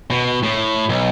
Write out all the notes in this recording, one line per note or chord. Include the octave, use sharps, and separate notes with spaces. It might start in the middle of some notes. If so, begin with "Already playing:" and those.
B2
A2
B1